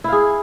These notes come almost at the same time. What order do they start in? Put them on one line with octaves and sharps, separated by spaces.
E4 F5 G#4